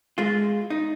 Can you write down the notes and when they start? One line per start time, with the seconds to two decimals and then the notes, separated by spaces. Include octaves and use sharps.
0.18 G#3 F4
0.70 D#4